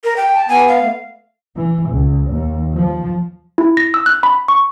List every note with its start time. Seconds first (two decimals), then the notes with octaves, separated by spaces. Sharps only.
0.04 A#4
0.17 G5
0.35 A5
0.49 B3 G#5
0.68 F5
0.80 A3
1.54 E3
1.90 C#2
2.28 D#2
2.77 F3
3.58 E4
3.77 A#6
3.94 E6
4.06 F#6
4.23 B5
4.48 C#6